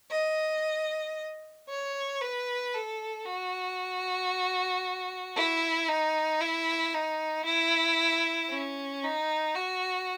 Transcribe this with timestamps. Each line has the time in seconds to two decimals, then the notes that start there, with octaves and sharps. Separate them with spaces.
0.11 D#5
1.69 C#5
2.21 B4
2.74 A4
3.26 F#4
5.36 E4
5.88 D#4
6.40 E4
6.94 D#4
7.45 E4
8.50 C#4
9.04 D#4
9.55 F#4